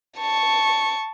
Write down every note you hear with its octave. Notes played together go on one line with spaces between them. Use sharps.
A5 C#6